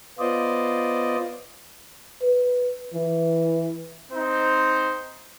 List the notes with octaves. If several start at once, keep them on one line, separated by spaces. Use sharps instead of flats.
B3 F4 C5 D5 D#5
B4
E3
C4 D#4 C5